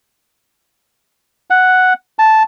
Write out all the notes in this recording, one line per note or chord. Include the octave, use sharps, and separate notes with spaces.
F#5
A5